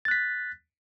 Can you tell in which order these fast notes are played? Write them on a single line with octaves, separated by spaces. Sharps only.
A6 F#6 B6